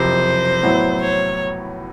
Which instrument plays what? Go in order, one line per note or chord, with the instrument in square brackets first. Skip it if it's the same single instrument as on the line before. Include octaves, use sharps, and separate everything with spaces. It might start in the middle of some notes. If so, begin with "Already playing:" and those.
Already playing: [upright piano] F#1 F2 C3 [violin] C5
[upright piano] A2 F#3 B3 E4
[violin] C#5